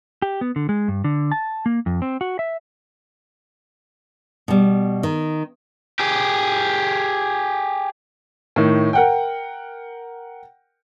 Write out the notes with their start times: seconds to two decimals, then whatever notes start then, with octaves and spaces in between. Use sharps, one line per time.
0.22 G4
0.41 B3
0.56 D3
0.69 G#3
0.88 G2
1.04 D3
1.32 A5
1.66 A#3
1.86 F2
2.02 C4
2.21 F#4
2.39 E5
4.48 B2 G3
5.03 D#3
6.00 G4 G#4
8.56 A2 D#3
8.93 A#4 F#5 G5